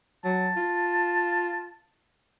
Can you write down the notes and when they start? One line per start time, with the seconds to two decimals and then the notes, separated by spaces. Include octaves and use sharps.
0.25 F#3 A5
0.56 F4